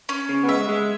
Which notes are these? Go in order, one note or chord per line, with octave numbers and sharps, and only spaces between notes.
C#4
C#3
B3
G#3 E5
G#3